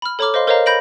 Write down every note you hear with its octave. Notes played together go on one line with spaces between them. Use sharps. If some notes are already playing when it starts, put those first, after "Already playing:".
B5 F6
A4 C#5 A#5 B5 D6 F6
C5 D#5 F5 C6
A#4 C5 C#5 D#5 F5 A#5
B5 G6 A#6 D7 F#7